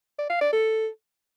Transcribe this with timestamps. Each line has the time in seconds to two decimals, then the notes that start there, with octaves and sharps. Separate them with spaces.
0.18 D5
0.30 F5
0.41 D5
0.53 A4